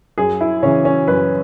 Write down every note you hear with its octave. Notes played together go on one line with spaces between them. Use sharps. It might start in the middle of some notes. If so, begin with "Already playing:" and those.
F#2 G#4
E4
C#3 E3 C#4
C#4
F#2 B4